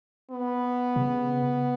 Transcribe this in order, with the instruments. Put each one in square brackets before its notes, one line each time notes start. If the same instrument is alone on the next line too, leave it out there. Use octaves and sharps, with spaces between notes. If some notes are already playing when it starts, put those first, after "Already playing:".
[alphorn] B3
[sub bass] C3
C#3